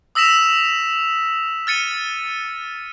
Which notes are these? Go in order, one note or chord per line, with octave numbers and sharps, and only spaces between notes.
D#6 E6 A#6 B6 E7 F7
F6 A6 C#7 D#7